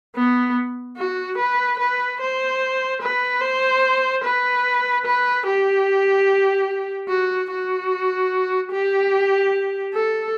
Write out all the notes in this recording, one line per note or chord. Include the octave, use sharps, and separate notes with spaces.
B3
F#4
B4
B4
C5
B4
C5
B4
B4
G4
F#4
F#4
G4
A4